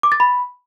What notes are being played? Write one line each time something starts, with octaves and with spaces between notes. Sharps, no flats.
D6
A6
B5